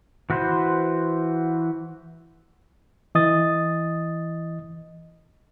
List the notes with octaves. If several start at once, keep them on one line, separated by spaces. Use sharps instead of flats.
E3 F#4 B4 C5
E3 D#5 D#6 A6